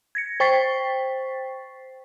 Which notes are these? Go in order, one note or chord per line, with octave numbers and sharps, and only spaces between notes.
G#6 A#6 C#7
C5 G5 C#6 A6 B6 C7